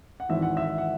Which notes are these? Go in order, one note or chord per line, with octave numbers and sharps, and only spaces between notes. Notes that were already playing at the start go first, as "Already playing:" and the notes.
F#5
G#1 G#2 E3 E5
F#5
E5
F#5